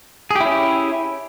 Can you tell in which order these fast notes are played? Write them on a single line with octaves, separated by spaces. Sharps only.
G#4 G4 E4 C#4